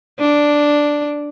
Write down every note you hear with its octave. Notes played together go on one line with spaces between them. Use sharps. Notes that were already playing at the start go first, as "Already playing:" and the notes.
D4